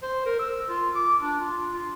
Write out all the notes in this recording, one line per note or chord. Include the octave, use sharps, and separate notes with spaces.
C5
A#4
E6
F4
D6
D4
F4
F4